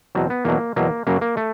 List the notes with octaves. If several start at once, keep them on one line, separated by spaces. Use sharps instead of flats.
E2 B2 F#3 C4
B3
E2 B2 F#3 A#3
E2 B2 F#3 A#3
F#2 C#3 F#3 A#3
A#3
A3